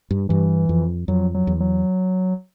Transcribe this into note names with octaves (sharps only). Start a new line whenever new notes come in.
G2
G2 E3
F2
F2 F#3
F#3
E2
F#3